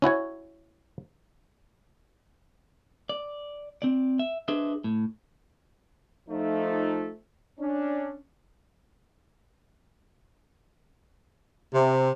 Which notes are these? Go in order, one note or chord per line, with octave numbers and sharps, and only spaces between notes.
C#4 E4 F#4 C#5
D5
C4 D5
E5
D4 G#4 B4 C5 D#5 E5
A2
F3 A3 D#4
C#4 D4
C3